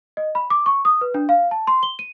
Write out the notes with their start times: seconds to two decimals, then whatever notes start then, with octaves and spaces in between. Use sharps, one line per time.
0.17 D#5
0.35 B5
0.50 D6
0.66 C#6
0.85 D#6
1.01 B4
1.14 D4
1.29 F5
1.51 A5
1.67 C6
1.83 G7
1.99 D#7